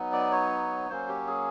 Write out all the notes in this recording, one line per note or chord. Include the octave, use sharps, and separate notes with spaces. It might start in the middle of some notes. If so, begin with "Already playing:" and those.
Already playing: F#3 B3 D#4
D5
C#5
F#3 A#3 C#4 C5
G4
G#4